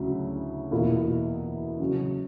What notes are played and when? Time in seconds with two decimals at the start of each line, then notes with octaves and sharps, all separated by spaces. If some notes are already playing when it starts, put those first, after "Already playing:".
Already playing: D2 C#3 F#3 C#4 E4
0.71 E2 B2 A#3 E4
1.79 C#3 F#3 C#4